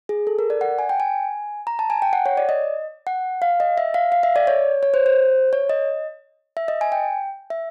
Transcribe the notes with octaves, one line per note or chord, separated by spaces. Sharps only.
G#4
A4
A#4
D5
F#5
G#5
G5
G#5
A#5
A5
G#5
G5
F#5
C#5
D5
D#5
F#5
F5
D#5
E5
F5
F5
E5
D5
C#5
C#5
C5
C5
C#5
D#5
E5
D#5
G#5
G5
E5